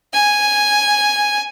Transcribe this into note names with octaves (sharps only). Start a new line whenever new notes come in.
G#5